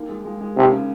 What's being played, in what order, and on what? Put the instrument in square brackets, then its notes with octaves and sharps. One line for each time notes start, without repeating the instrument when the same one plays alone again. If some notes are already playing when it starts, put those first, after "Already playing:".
Already playing: [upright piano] D#2 A#3
G#3
G#3
G#3
[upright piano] D#2 [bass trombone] C3
[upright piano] C#3